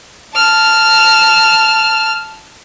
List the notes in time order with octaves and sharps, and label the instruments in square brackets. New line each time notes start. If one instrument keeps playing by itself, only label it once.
[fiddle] A5 F6